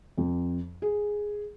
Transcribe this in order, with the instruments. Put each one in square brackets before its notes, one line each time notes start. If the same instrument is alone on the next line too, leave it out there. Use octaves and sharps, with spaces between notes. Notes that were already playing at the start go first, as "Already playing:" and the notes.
[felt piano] F2
G#4